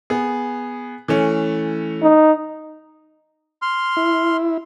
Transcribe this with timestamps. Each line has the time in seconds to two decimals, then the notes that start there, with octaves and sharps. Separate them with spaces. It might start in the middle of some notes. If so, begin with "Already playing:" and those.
0.10 B3 G#4
1.08 E3 A3 C#4
2.02 D#4
3.62 C6 F6
3.97 E4